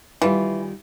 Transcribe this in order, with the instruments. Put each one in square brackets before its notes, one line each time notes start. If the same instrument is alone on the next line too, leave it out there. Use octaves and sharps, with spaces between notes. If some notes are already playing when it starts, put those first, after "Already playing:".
[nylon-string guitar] D#3 G3 F4 [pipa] E3